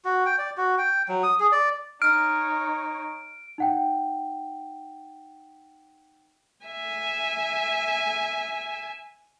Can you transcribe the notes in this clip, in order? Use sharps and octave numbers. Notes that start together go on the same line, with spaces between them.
F#4
G5
D5
F#4
G5
F#3
D#6
G#4
D5
D#4 C#5 F6 D7
D#4 F#5 G5
E5 G#5